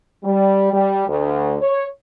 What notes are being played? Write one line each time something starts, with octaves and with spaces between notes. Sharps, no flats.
G3
G3
D2
C#5